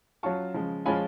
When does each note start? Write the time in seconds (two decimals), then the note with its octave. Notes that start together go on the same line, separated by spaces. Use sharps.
0.23 F#3 C#4 F4 A5 C#6
0.54 C#3 F3 G#3
0.85 F3 G#3 C#4 F4 G#5 B5